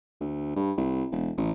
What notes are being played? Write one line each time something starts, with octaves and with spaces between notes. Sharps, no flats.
D2
G2
C2
E1
A1